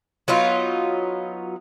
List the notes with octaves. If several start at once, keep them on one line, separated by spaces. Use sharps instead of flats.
F#3 B3 D#4 F4